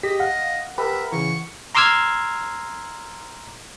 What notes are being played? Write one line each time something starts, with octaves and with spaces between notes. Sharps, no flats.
G4 G#4 D#5 B6
F5 F#5
G4 A#4 B4 E5
C#3 E3 C#6
A#5 C6 D6 E6 F6 G#6